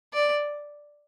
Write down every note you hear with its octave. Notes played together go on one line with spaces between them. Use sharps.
D5